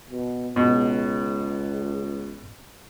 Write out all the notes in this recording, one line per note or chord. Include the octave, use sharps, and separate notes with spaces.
B2
C#2 B2